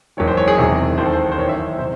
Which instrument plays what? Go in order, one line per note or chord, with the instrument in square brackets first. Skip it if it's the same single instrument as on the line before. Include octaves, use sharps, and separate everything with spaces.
[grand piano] F#1 E2 D#3 C#5
C5
C#5
G#4
E1 E2 C3 D#3
D#2 D#3 C5
A4
C5
C5
F#1 E2 D#3 C#5
E5
C3 E3 C5